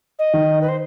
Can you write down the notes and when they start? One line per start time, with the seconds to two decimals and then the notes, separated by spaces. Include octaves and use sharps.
0.18 D#5
0.34 D#3
0.61 B4
0.68 C5